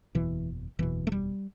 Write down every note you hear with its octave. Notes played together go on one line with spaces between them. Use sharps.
F#1 E2 B2 E3
F#1 E2 B2 E3
A3
G3